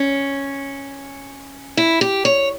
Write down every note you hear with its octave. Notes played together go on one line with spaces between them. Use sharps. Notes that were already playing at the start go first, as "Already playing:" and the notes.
Already playing: C#4
E4
G4
C#5